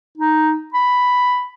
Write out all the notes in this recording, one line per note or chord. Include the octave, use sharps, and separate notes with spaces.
D#4
B5